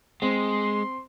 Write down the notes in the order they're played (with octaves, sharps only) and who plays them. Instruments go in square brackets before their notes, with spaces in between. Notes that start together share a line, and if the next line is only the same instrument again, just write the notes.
[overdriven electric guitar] G#3 [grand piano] C4 [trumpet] C6